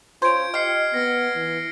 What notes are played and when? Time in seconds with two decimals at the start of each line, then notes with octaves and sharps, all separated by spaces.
0.22 C#4 F4 C5 G#6 D7
0.54 G4 D#5 F6 C7 C#7
0.94 B3 F6 A#6
1.36 E3